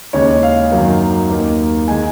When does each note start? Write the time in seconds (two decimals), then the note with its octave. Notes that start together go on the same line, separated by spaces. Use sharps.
0.13 D#2 C#3 G#3 C#5
0.43 F5
0.72 F#2 D#3 F#3 A#3
1.30 D#2 D#3 A#3
1.88 D#3 G#3 G#5